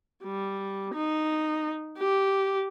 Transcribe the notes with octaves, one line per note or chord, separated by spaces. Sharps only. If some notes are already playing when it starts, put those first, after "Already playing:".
G3
D#4
G4